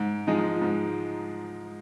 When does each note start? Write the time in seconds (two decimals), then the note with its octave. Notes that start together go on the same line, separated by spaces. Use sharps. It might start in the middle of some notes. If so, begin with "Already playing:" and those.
Already playing: G#2
0.27 F3 G#3 D#4
0.62 G#2